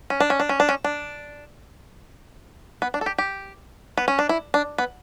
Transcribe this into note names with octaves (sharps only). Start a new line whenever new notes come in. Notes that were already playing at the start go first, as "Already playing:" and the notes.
C#4
D4
C#4
D4
C#4
D4
C#4
D4
B3
D4
A4
G4
G4
B3
C#4
D4
E4
D4
B3